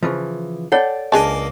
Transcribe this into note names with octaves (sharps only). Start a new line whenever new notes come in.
C#3 E3 F3
A4 C#5 D5 F#5 G5
C#2 A#3 D4 G#4 D#5 A5